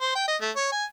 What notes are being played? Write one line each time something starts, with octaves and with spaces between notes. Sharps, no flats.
C5
G5
D#5
A3
C#5
G#5